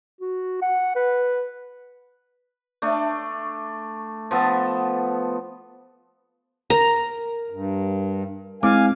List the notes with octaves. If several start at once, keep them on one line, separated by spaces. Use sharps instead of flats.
F#4
F#5
B4
A3 D4
F3 B3 A4
A#4 A#5
G2
G#3 C4 E4 F5 G#5 D6